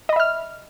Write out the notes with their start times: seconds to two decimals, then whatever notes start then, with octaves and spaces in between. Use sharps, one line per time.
0.09 D#5
0.13 B5
0.16 E5
0.20 F6